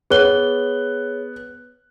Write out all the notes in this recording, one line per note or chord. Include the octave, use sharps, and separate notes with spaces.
B3 G#4 C#5 F#6 G7